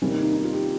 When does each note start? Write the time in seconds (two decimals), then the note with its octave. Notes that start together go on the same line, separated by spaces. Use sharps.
0.01 C3 D#3 G3 A#3 C#4
0.12 D#4
0.22 D#4
0.33 D#4
0.43 F4
0.53 G4